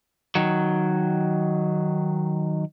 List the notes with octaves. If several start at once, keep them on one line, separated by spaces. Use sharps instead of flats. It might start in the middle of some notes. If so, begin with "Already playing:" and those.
D#3 F#3